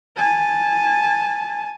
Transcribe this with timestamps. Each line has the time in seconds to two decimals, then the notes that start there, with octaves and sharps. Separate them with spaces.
0.16 G#5 A5